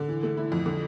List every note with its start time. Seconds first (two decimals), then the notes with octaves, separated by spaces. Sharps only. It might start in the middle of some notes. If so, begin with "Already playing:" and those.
Already playing: D3
0.09 E3
0.23 A3
0.37 E4
0.52 F2
0.66 D3